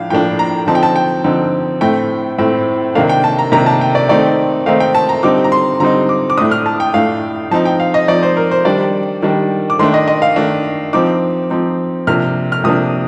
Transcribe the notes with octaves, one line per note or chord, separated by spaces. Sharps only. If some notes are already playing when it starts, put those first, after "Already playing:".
Already playing: A2 F3 D4 F5
A2 F3 A#3 D4 G5
A#5
D3 F3 C4 D#4 A5
G5
A5
G5
D3 F3 C4 D#4
A2 A3 C4 G5
A2 A3 C4
C3 D#3 A#3 D4 F5
G5
A5
A#5
C3 D#3 A#3 D4 A#5
A5
G5
D5
D#3 A3 C4 D#4 D5
D#3 A3 C4 D#4 F5
G5
A5
A#5
D3 G3 C4 D#4 D6
A#5
C6
D3 G3 C4 D#4 A#5
D6
D6
A2 A3 D4 D#6
F6
A5
G5
A2 A3 D4 F5
F3 C4 D#4 A5
G5
F5
D#5
F3 C4 D#4 D5
C5
A#4
C5
D#3 G3 D4 D5
D#3 G3 D4
D6
D#3 A3 D4 C6
D#5
D#5
F5
D#3 A3 D4
F3 C4 D#4 D6
F3 C4 D#4
C3 F3 A#3 D4 F6
F6
C3 F3 A#3 D4 D#6